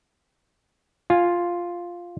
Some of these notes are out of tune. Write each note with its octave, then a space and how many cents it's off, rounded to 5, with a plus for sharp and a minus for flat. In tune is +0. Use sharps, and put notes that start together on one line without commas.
F4 +0 G#5 +0